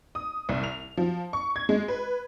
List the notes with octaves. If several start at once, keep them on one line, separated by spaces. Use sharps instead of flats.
D#6
C2
F7
F3
C#6
G#6
G#3
B4